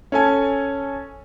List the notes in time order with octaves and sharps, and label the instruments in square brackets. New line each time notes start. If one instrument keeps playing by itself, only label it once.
[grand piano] C#4 A4 G#5